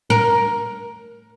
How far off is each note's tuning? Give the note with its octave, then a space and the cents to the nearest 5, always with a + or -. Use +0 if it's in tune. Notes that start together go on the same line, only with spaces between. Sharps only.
A#4 +10